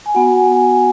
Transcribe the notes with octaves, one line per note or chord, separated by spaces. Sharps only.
G#5
B3 F#4 F#5
G#5
G#5
G#5